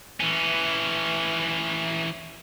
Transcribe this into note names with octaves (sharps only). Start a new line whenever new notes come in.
E3 C#4